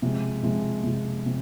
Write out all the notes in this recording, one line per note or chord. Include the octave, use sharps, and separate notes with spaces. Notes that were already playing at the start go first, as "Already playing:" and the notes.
C3 F3 G#3
C3 F3 G#3
C3 F3 G#3
C3 F3